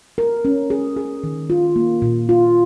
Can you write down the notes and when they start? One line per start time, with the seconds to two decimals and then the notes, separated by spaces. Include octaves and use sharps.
0.18 A#4
0.45 C#4
0.70 G#4
0.97 G#4
1.24 D#3
1.50 F4
1.76 A#3
2.02 A#2
2.29 F4